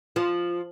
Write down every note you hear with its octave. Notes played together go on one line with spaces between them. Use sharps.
F3